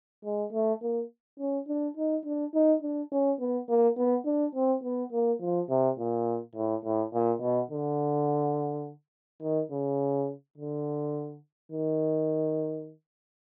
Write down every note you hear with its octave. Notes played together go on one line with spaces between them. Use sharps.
G#3
A3
A#3
C#4
D4
D#4
D4
D#4
D4
C#4
B3
A#3
B3
D4
C4
B3
A#3
F3
C3
A#2
A2
A2
A#2
B2
D3
D#3
C#3
D3
D#3